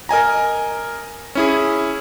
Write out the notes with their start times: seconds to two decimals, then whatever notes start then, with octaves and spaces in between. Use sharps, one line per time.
0.09 A#4 D#5 G#5 A#5
1.35 C#4 E4 G#4